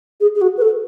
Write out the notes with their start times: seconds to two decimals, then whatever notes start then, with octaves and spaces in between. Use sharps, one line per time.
0.20 G#4
0.35 G#4
0.41 F#4
0.57 B4
0.62 A4